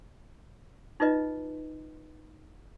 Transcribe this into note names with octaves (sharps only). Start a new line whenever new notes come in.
D#4 F4 B4 D#5